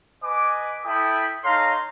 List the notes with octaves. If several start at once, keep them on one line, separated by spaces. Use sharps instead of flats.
B4 D#5 G#5 D6
E4 A4 G5 B5 D#6
D#4 A4 C#5 F5 A#5 C6